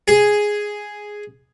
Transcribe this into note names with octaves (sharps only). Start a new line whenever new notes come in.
G#4